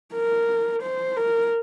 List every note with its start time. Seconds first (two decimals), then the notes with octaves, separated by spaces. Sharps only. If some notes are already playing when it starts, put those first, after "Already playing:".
0.14 A#4
0.82 C5
1.16 A#4